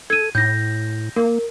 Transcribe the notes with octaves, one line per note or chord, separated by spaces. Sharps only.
A4 G#6 D#7
A2 G6 A#6
A#3 A#4